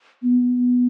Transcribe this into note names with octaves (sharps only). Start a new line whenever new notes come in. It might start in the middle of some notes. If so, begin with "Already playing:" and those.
B3